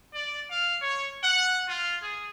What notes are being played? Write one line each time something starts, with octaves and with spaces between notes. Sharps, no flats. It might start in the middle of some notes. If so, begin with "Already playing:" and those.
D5
F5
C#5
F#5
F4
G#4